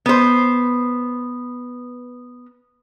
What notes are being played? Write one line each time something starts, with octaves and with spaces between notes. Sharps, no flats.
B3 C5